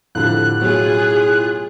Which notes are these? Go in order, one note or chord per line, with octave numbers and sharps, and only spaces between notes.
F2 A2 D3 F3 G4 F#6
B2 F#3 F4 G#4